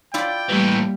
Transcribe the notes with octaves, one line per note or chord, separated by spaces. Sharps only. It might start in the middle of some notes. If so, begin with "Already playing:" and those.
E4 F4 D5 G5
A2 E3 G3 A#3